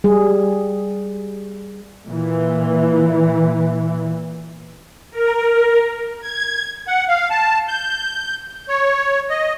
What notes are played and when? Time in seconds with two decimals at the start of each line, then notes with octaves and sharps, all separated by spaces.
0.04 G3 G#4
2.06 A#2 E3
5.11 A#4
6.20 G#6
6.88 F#5
7.08 F5
7.31 A5
7.68 G6
8.69 C#5
9.30 D#5